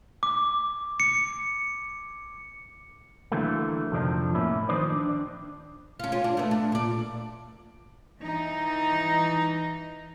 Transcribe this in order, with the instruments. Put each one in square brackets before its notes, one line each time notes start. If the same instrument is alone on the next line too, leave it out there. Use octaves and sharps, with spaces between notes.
[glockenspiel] D6
C#7
[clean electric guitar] D3 E3 F#3 A3 A#3
F2 C3 F3 D4 D#4
A2 A#3 C#4 E4
D#3 F3 D#4 B4 C5 D5
D4
[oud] C#4 F4
C#4 F4
D4
A3 B3
D4
A#2 D5
[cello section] E3 D#4